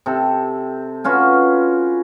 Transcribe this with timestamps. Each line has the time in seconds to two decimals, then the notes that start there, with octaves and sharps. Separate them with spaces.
0.06 C3 A4
1.04 C#4 F4 F#4 B4